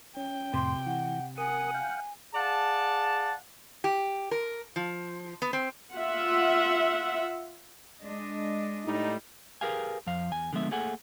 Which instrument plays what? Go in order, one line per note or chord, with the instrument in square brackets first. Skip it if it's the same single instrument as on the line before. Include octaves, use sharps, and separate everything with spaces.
[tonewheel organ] C#4 [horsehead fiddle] G5
[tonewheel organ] F2 A2 [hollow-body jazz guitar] C3 [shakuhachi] C6
[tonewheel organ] E3 [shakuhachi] F#5
[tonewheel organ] A#4 D#6 [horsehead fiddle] F#5 [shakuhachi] G#5
[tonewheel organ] F5 G5
[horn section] G#4 D5 F5 F#5 A5
[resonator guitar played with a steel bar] G4
A#4
F3
B3
C4
[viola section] F4 E5 F#5
[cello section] G#3 D4 D#5
[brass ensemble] A2 G3 D#4
[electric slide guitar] G4 G#4 A#4 B4 F5 G#5
F2 F3 F5
E2 G#5
D3 F3 G#3 B3 E5
A3 A#3 G#4 A4 F#5 G#5